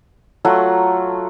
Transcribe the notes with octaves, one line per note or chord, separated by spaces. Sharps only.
F#3 A3 F4 F#5